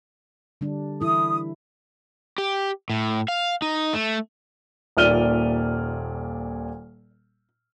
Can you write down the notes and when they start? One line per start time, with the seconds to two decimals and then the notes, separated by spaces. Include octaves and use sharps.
0.61 D3 G3 D4
1.01 E3 E4 A4 D#6
2.38 G4
2.90 A2
3.28 F5
3.62 D#4
3.93 A3
4.97 D#1 A#2 D5 F6 D#7 G7